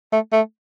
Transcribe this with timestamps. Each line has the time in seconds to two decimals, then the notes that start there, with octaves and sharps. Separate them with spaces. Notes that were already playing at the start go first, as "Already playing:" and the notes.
0.13 A3
0.32 A3